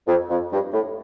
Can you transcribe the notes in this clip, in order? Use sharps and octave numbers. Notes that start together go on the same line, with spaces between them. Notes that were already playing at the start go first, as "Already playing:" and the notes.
F2
F2
G2
A2